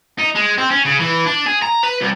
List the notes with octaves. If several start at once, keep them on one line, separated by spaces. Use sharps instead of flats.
D#4
G#3
C4
C#4
C#3
E3
D4
G#4
A#5
B4
C2